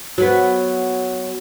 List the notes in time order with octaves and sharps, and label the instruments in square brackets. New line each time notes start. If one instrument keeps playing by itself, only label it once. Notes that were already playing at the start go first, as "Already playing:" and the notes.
[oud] F#3 B3